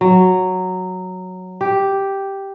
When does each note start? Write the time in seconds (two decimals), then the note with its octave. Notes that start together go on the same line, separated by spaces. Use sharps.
0.01 F#3
1.61 G4